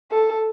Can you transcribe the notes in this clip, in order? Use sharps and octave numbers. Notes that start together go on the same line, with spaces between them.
A4